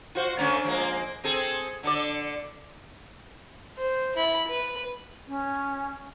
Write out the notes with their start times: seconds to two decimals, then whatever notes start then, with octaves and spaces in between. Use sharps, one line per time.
0.15 F4 F#4 C5
0.37 D3 A3 C#4
0.64 F3 G#3 A#3
1.24 C4 G#4 A4
1.83 D3 A4 D5
3.77 C5
4.16 E4 B5
4.48 B4
5.27 C#4